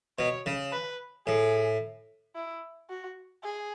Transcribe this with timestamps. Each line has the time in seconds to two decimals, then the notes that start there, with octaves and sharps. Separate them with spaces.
0.19 B2 C#5
0.46 C#3
0.72 B4
1.27 A2 G#4
2.35 E4
2.90 F#4
3.44 G#4